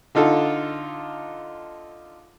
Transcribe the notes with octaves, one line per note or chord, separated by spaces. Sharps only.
D3 D#4 F4 A4